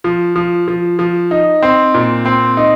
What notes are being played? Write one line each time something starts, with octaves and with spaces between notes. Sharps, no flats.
F3
F3
F3
F3
D#4
C4
A#2
C4
D#4